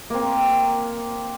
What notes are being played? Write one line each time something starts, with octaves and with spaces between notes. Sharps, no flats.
A#3 C4